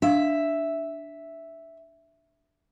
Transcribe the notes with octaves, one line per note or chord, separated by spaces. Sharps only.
D4 E5 F5